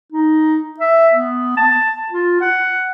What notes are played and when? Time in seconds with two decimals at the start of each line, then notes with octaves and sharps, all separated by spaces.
0.12 D#4
0.80 E5
1.13 B3
1.57 A5
2.11 F4
2.41 F#5